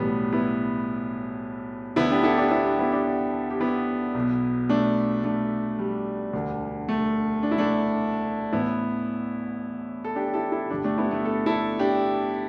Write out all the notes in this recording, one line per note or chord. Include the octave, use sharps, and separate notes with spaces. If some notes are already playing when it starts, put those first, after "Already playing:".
Already playing: B1 A2 E3 G3 B3
B3 E4
D2 D3 B3 E4
D4 G4
E4 A4
D4 G4
B3 E4
D4 G4
B3 E4
D4 G4
G4
B3 E4
B1
B2
A3 D4
A3 D4
G3
E1 D2 D3
A3
D4
E4
A3 D4
A1 A2 E3 B3 E4
A4
D4 G4
E4 A4
E4 A4
G1 G2 D3 D4 G4
A3 D4
B3 E4
A3
A4
E4 A4
D4 G4